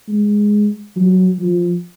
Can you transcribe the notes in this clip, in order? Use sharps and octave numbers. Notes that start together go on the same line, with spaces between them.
G#3
F#3
F3